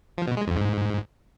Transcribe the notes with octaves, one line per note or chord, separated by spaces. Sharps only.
F3
B2
G#3
F2
G#2